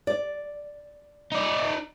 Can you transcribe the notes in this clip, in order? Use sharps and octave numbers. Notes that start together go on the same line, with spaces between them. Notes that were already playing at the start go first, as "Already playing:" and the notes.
D5
D#4 D5